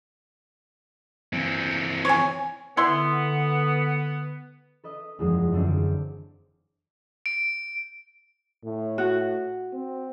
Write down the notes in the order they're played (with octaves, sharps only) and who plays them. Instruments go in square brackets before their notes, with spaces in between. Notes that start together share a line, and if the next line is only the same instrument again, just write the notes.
[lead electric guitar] E3 C4
[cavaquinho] C#5 G#5
[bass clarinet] D3 [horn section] B3 [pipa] E4 C6
[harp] A4 B4 D#5
F#1 E2 F3 G#3 D#6
F#2 D3 C4 D5
[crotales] D7
[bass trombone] A2
[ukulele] F#4
[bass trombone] C4